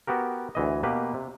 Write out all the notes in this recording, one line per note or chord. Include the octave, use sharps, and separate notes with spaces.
B3 F#4 G4 A#4
D2 E3 D#5
B2 A#3 G4 B4
C3